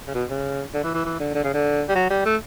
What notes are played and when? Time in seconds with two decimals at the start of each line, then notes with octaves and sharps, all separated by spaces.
0.07 C#3
0.14 B2
0.30 C#3
0.74 D3
0.84 E3
0.95 E3
1.05 E3
1.20 D3
1.35 D3
1.44 C#3
1.54 D3
1.89 G3
1.95 F#3
2.10 G3
2.25 A3